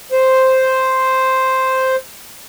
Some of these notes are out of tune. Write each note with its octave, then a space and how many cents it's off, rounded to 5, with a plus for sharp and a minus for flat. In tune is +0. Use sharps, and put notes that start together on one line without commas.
C5 +0